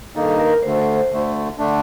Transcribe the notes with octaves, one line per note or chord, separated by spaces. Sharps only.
G2 D#3 A#3 D#4 A4
A#4
D2 D3 A3 C5
C5
D2 D3 A3
D3 A3 D4